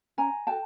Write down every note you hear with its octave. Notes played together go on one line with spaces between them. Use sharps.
C#4 G#5 A#5
F#4 A4 G5 A5